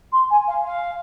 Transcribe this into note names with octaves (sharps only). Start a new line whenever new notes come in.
C6
G#5
F5
F5